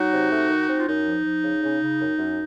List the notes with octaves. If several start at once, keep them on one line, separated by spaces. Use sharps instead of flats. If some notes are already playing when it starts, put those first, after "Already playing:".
Already playing: F#3 D#4 F#4
C3
A3
D#3
C4
F4
F#2 D#4
F3
F3
C#3
C#3
C#3
F#2
F#2